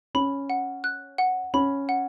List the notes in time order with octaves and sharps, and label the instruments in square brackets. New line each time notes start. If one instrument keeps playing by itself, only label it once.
[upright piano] C#4 [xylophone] B5
[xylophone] F#5
F#6
F#5
[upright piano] C#4 [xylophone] B5
[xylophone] F#5